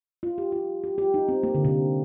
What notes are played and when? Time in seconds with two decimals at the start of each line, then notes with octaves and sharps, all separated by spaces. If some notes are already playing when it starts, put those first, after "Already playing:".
0.23 F4
0.38 G4
0.52 F4
0.84 G4
0.98 G4
1.14 D#4
1.29 C4
1.43 A#3
1.55 D3
1.65 C3